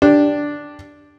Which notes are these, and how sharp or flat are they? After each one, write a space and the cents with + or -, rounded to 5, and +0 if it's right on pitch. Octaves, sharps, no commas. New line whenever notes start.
D4 +0 G4 +0